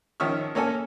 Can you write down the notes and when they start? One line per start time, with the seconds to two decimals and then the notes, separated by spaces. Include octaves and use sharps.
0.20 D#3 F3 C#4 E5 C#6 F6
0.55 A#3 C#4 A4 C#5 G#5